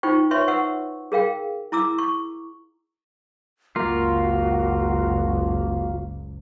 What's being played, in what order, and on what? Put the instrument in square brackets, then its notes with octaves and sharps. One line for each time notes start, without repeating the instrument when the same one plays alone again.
[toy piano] D#4 F4 C5 G5 C#6
B4 C#5 E5 C6 C#6
B4 F#5 C#6 E6
G#4 A#4 F5 G5
E4 A#5 D6 E6
C#6
[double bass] F#1 C#2 [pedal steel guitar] A#3 F4 [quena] F#4